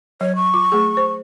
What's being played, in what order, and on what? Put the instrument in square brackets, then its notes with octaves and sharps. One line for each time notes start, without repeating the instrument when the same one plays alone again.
[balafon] F#3 [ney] C#5
[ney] C#6
[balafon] F4 D6
A3 G#4
C5